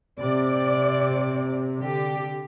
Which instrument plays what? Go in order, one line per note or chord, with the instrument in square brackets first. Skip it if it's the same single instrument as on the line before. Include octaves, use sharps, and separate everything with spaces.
[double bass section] C3 [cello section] D5
[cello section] D3 G4